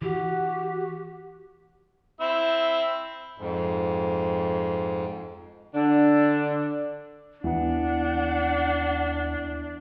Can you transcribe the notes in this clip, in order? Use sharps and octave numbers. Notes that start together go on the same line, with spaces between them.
E3 F#4 G4
C4 E4 E5
F2 G#2
D3 D4
D#2 E3 B3 D4 F#5